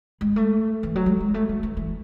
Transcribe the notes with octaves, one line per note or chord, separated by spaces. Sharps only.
G#3
A3
E3
F#3
G#3
G#3
A3
G#3
E3
E3